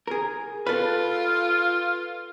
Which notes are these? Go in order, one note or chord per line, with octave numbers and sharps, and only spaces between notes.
G#4 A#4
F4 A4 B4